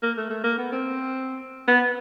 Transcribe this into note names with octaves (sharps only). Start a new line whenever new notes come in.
A#3
A3
A3
A#3
B3
C4
B3